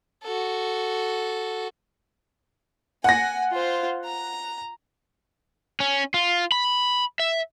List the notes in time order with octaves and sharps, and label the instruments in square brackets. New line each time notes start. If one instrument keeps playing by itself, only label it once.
[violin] F#4 A4
[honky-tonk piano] F#5 A#6 [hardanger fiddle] G#5
[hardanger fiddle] F4 C5
A#5
[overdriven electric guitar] C#4
F4
B5
E5